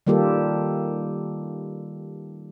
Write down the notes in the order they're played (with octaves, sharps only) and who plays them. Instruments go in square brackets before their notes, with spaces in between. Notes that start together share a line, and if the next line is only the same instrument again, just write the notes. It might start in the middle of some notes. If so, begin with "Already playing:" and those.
[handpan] D#3 G3 A#3 F4 G4 A4